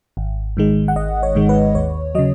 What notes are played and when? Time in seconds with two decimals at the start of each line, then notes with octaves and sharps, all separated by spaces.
0.17 G#1
0.57 G#2 D#3 G#3
0.88 F#5
0.96 G#1 D#5
1.23 C#5
1.35 G#2 D#3 G#3
1.49 B4
1.75 D#2 C#5
2.15 C#3 F#3 D#5